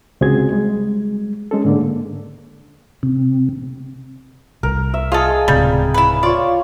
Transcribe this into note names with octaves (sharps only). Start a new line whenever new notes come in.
C#2 C3 C4 F#4 G#4 G#6
G3 G#3
G#3 C#4 A4
G#2 D3 A#3
C3
C2 A#4
E5
F4 G#4 A4 D#5 F5
D1 C#2 C3 G3
E4 B4
F4 C#5 D5